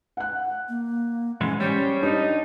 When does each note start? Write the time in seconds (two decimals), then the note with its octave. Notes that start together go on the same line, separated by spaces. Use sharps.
0.17 F#5 F#6
0.68 A#3
1.41 G#2 E3 G#3 C#4
1.60 G3 C#4 G4 C5 C#5
2.03 D4 D#4 G4